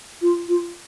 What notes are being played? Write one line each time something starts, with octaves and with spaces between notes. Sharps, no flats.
F4
F4